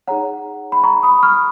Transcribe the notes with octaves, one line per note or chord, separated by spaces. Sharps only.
D#4 G#4 C#5 F#5 A#5
B5
A#5 C#6
B5 D#6
C#6 F6